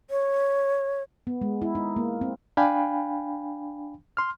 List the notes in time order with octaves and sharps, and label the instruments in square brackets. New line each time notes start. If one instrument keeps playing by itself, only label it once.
[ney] C#5
[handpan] B3
G#3
E4
D#4
A#3
C4
[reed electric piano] D4 F5 G5 G#5 B5
C6 F6